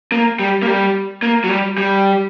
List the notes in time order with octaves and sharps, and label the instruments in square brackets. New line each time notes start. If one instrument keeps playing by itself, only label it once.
[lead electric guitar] A#3
G3
A#3
G3
A#3
F#3
G3
G3